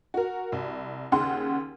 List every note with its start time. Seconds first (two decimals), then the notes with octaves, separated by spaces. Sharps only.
0.14 F#4 A#4
0.52 C2
1.12 D#2 C#3 C#4 F#5 C6